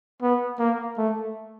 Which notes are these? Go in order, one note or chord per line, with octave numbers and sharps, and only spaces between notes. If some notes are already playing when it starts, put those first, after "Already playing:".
B3
A#3
A3